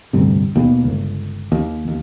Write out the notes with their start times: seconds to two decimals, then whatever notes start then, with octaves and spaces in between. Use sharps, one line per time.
0.13 D1 D2 G2 C3
0.56 D#2 B2
0.84 G1 C#2
1.52 D#2
1.88 D#2